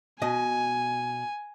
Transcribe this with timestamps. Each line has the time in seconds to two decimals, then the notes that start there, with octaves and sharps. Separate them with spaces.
0.22 B2 D#5 G#5